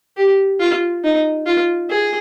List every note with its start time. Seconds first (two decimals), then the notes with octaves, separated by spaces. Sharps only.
0.17 G4
0.60 F4
1.04 D#4
1.46 F4
1.90 G#4